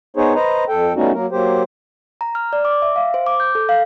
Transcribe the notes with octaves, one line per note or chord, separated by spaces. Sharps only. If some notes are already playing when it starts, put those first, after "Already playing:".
B3 D#4 G#4 C5 C#5
B4 C5 D#5 A#5
F2 A4 G5
G3 A3 B3 C#4 D#4 F#4
F#3 A#3 A#4
F#3 A#3 G4 C5
A#5
F6
D5
D6
E5
F5
C5
D6
G6
A4
F5